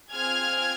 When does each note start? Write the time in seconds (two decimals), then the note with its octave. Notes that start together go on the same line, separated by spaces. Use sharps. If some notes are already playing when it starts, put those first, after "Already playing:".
0.12 C4 F4 G#4 F6 G#6